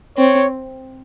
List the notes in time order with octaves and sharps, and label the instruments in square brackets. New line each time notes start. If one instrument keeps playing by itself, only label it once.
[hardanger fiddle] C4 [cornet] C#5